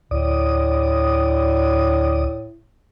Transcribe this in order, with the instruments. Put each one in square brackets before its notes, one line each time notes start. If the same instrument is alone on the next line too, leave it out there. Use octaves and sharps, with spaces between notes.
[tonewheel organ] D2 D5 D#6 [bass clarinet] A2